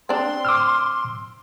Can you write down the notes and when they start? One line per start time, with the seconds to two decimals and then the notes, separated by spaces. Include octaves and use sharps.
0.09 C4 D4 C6
0.45 D6 E6 F6